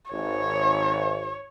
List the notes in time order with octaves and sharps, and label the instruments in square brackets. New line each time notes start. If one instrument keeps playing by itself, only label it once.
[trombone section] G#1 [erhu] C#5